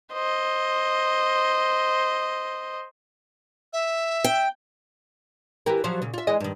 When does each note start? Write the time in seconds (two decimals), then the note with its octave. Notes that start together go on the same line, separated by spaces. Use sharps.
0.13 C5 D#5
3.73 E5
4.24 G5
5.66 E3 G4 A#4
5.84 F3 F#3 C5
6.02 A#2 C#3
6.14 F4 E5
6.27 E3 G#3 D#5
6.40 G2 D#3